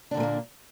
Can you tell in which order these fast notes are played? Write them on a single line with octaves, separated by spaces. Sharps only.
D4 D3 A#2 A3 A#3